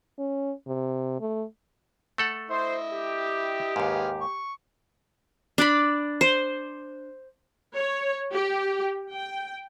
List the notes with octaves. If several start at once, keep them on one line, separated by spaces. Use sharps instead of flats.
C#4
C3
A3
A3 A4 F#5
E4 C5 D#5
G4
D#2 G#2 G#4 B4 F5
C#6
D4 D5 B5
C5
C#5
G4
G5